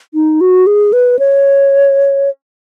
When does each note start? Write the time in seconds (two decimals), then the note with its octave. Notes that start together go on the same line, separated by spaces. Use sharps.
0.14 D#4
0.41 F#4
0.67 G#4
0.93 B4
1.19 C#5